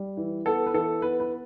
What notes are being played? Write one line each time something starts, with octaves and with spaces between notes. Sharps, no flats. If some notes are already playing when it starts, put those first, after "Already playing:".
Already playing: G3
E3
B3 A4
B4
E3 A4
B3 B4
B4